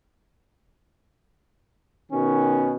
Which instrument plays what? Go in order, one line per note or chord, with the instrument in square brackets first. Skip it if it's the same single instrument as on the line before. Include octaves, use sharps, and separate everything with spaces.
[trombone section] B2 D#3 C#4